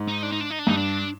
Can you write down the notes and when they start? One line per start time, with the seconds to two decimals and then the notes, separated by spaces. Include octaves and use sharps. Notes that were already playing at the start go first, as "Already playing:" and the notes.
Already playing: G#2
0.08 D#4
0.23 D4
0.32 D#4
0.40 D4
0.50 D#4
0.59 D4
0.67 G2 D#4
0.77 D4